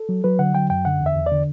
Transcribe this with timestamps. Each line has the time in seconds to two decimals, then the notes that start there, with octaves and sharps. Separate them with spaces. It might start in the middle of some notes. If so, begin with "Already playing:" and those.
Already playing: A4
0.09 F#3
0.24 F#3 B4
0.39 D3 F#5
0.55 F#3 G5
0.70 F#2 G5
0.85 D3 F#5
1.01 E2
1.06 E5
1.16 E2
1.26 D3 D5